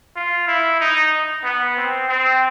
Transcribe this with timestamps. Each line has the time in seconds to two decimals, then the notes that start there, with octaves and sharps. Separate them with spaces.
0.16 F4
0.47 E4
0.80 D#4
1.44 B3
1.77 C4
2.09 C4